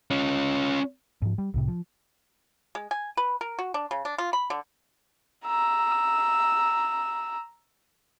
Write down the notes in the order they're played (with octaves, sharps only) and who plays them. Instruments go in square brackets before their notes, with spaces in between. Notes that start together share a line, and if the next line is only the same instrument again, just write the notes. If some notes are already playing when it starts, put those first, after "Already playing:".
[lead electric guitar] C#4 F4
[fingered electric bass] G#2 F3
G3
C2 A2 C3
F3
[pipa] G#3
G#5
B4
A#4
F#4
D4
C#3
D4
F4
B5
D3
[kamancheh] A#5 E6